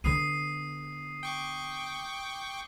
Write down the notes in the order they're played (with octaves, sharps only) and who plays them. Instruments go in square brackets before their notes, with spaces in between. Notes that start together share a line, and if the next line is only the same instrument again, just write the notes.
[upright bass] D3 B3 [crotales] D#6 C7 D#7
[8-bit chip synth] G5 C#6 D6